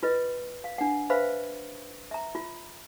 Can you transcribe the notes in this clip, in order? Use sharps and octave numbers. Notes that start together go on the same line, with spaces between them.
F4 B4 D#5
F5
D4 F#5
B4 C5 E5 F5 B5
E5 A#5
F4